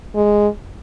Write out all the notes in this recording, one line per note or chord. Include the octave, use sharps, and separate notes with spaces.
G#3